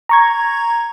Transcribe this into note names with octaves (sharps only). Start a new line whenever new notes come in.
A#5 C#6 G#6